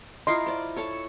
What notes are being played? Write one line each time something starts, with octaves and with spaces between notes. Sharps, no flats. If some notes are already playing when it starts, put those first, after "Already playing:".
E4 F4 A#4 D#5 C6
C5 D5
A4 C#5 A5